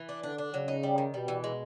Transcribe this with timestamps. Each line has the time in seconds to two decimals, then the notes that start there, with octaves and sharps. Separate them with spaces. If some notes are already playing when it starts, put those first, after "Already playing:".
Already playing: E3
0.09 D4
0.23 D3 D4
0.38 D4
0.53 C#3 F#3
0.68 D#4
0.83 G3
0.98 D#3
1.13 B2 G3
1.28 E3
1.44 G#3